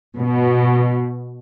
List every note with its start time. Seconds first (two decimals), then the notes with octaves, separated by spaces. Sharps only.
0.17 B2